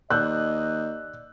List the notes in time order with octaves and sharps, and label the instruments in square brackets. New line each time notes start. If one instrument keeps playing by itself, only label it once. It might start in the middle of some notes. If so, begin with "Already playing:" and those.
[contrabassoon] D#2 [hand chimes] D5 E6 [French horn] D#5 [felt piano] F#6 G6